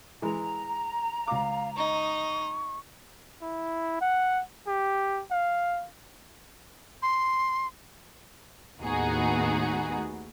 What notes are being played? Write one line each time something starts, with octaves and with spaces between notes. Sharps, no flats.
E3 G#3 A#5
C#2 F5 D6
D#4 D#5 C#6
E4
F#5
G4
F5
C6
D#2 A2 B3 D#4 F#4 G#4